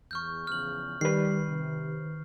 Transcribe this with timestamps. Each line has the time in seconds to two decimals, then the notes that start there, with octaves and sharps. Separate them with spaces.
0.11 E2 C#6 F6 G6
0.47 E2 C#3 F3 F6 F#7
1.01 D#3 G3 B4 C7
1.49 C3